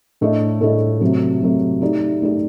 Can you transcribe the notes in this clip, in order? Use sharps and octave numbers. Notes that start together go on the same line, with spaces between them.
A2 A3 D4 A4 D#5
A2 A3 D4 A4 D#5
C3 F#3 A3
C3 F#3 A3
A3 D#4 G4 D5
A3 D#4 G4 D5